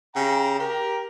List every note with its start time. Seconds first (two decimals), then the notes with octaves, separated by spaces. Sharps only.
0.15 C#3 G4 G5 A#5
0.60 G4 A#4